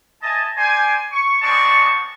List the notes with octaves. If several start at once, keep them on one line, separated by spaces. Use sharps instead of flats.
D#5 E5 G#5 A5
C5 D5 G5 G#5
C#6
G#3 B3 C4 D5 A5 C#6